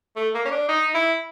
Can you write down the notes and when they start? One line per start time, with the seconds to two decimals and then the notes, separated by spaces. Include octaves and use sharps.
0.16 A3
0.34 A#3
0.45 C#4
0.51 D4
0.68 D#4
0.94 E4